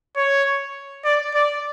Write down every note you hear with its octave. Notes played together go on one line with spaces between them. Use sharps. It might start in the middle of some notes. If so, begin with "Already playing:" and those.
C#5
D5
D5